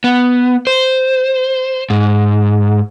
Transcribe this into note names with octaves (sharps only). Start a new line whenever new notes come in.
B3
C5
G#2